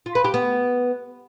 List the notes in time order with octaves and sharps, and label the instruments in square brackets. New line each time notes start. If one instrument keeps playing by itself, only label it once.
[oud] F4
B4
G4
B3